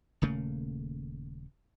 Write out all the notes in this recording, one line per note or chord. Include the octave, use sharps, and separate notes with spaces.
D#1 C#3 A3 A#3